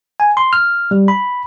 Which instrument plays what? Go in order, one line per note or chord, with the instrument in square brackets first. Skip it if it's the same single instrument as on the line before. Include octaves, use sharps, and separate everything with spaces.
[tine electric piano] G#5
C6
F6
G3
B5